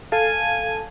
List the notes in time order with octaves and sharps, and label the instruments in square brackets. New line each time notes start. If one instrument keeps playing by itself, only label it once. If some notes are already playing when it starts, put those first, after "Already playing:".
[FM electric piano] A4 F5 A5 [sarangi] G#5